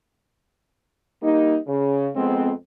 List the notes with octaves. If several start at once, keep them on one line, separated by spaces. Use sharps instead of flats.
G3 A#3 D#4
C#3
F2 G#3 B3 C4